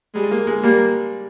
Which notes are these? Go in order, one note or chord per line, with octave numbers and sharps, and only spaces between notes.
G3 G#3
A#3
G#3
G3 A#3